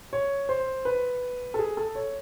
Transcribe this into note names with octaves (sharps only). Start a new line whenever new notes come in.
C#5
C5
B4
A4
G#4
A4
C#5